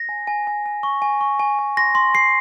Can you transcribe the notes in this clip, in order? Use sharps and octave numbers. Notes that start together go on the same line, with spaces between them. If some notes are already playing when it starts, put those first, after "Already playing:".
Already playing: A#6
G#5
G#5
G#5
G#5
C#6
G#5
C#6
G#5
G#5
C6 A#6
C6
C6 C7